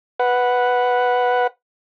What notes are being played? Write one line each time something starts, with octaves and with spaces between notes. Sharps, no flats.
B4 F#5